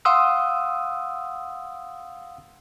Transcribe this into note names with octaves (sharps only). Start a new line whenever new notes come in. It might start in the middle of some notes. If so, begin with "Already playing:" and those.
F5 F#5 C6 D#6 E6